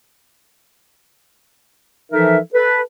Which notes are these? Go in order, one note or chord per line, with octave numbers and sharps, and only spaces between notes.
E3 F3 D#4 A4 A#4 E5
A4 B4